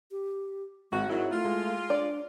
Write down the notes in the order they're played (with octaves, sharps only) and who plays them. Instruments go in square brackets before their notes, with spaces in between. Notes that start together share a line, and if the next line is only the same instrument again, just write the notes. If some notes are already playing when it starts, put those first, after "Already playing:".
[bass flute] G4
[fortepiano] G#1 [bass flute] G#3 [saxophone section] F#4
[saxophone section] G#2 F#3 [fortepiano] E4 [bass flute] A#4
[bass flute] A3 [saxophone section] F4
[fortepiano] G#3
[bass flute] D4 [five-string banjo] D5